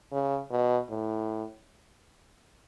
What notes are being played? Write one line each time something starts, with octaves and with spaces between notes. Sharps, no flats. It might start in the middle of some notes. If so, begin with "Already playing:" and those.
C#3
B2
A2